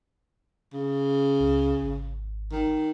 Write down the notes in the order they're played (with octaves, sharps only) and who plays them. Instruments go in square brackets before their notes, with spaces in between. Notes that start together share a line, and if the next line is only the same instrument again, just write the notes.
[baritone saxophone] C#3
[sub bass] C#2
G#1
[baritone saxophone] D#3